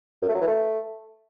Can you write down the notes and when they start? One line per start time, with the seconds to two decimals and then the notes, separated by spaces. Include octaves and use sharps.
0.22 F#2
0.28 A3
0.35 F#3
0.41 E3
0.47 A3